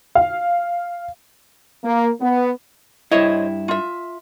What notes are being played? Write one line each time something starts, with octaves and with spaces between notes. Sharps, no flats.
F5
A#3
B3
G2 E4 C5 C#5 D#5
F4 E5